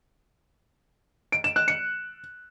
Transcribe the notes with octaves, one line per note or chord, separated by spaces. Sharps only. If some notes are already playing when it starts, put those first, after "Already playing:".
D7
E7
F#6
C#7